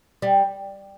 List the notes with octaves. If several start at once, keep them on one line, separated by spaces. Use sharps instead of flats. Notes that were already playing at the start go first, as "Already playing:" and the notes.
G3